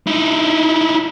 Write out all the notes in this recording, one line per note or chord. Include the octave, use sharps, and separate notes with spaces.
D#4 E4